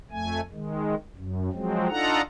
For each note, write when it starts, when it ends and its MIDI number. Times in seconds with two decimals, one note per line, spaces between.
0.11 0.41 41
0.11 0.41 57
0.11 0.41 80
0.52 0.95 51
0.52 0.95 56
1.15 1.50 42
1.53 1.88 53
1.53 1.88 54
1.53 1.88 56
1.53 1.88 60
1.89 2.21 62
1.89 2.21 63
1.89 2.21 65
1.89 2.21 69
1.89 2.21 78
1.89 2.21 82